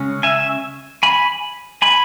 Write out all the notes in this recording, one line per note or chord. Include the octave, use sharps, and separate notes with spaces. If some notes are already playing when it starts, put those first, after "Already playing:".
Already playing: C#3 G#3 C#4
E5 G#5
G#5 B5
G#5 B5